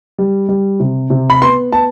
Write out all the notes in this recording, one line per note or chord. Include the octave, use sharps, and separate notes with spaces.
G3
G3
C3
C3
B5
B3 C6
B3 A5